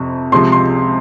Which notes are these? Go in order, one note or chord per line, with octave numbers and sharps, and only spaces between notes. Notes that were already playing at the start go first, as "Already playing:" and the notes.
Already playing: F2 C3 C#6
C#2 C3 F3 C6
C6